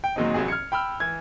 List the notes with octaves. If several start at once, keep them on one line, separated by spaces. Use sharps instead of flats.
G5
A#2 D#3 F#3 G#3 C4 D#4
A1 C3 F#3 G#4
F6 G#6 C#7
G5 B5 E6 F6
E3 G#6